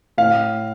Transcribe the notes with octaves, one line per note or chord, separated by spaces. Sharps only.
A2 F5